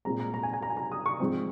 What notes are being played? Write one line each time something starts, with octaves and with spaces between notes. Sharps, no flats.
A#2 G#3 C4 A#5
A#5
A#5
G#5
G#5
A#5
G#5
A#5
D#6
C#6
G#2 F3 C4